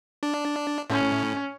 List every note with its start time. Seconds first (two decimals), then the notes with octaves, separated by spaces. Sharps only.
0.23 D4
0.90 A2 C#4